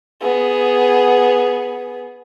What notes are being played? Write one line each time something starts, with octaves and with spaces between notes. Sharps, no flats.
B3 G#4